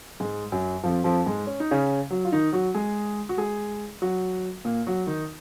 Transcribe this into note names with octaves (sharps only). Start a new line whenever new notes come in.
G#2 G#3
F#2 F#3
F2 F3
F2 F3
G#2 G#3
C#4
D#4
C#3 C#4
F#3 F#4
F4
D#3 D#4
F#3 F#4
G#3 G#4
F#4
G#3 G#4
F#3 F#4
A#2 A#3
F#3 F#4
D#3 D#4